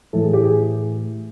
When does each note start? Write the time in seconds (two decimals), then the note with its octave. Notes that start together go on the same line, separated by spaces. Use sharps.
0.13 A2 E3 A4
0.24 G#4
0.33 G4
0.43 G#4